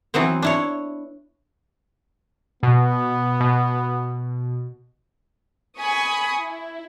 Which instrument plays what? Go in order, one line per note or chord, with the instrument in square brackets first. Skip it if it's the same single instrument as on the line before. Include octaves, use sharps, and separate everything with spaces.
[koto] E3 F#3 B3 C4
D4 E4 C#5
[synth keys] B2 [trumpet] B3
[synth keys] B2
[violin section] G#5 B5 C#6 D#6
E4